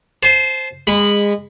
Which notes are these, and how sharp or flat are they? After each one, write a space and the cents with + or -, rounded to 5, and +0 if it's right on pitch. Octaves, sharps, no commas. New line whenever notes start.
C5 +0 A5 -35
G#3 -25 B5 +0